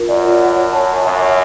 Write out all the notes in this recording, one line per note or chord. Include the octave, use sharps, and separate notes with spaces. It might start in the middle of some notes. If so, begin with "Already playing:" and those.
Already playing: F4 A#4
F#2 D5
F4
F#5
C#5
A5
C#5
F#2 E5
C#5